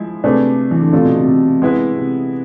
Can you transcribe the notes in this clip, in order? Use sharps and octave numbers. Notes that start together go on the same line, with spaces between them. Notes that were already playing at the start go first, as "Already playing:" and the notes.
Already playing: F3 G#3 E4
C3 A3 D4 G#4 B4
E3
D3
C3 A3 D4 F4 A4
B2
C3
C3
G#3 B3 E4 B4
C3